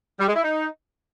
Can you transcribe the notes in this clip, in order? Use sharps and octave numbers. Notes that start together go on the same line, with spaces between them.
G3
G#3
E4
D#4